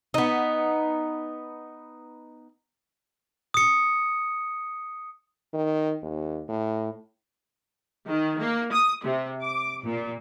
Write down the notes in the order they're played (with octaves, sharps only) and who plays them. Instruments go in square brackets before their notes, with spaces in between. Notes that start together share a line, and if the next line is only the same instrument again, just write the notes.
[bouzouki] B3 D#4
[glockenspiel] D#6 C#7
[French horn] D#3
D#2
A2
[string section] D#3
A#3
D#6
C3
D6
A#2